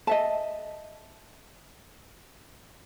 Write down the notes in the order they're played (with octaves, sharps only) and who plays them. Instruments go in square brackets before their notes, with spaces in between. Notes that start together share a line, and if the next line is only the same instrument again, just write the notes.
[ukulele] D#5 E5 A5